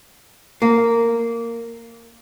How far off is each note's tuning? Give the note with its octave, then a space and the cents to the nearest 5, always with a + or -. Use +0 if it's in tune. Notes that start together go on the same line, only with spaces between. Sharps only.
A#3 -10